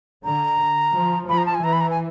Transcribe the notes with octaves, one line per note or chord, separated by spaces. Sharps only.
D3 A#5
F3
F3 B5
A#5
A5
G#5
E3 A#5
B5
A#5
G#5